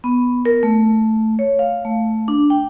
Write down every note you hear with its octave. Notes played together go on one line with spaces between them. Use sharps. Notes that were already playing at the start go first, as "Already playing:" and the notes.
B3
A#4
A3
C#5
F5
A3
D4
G5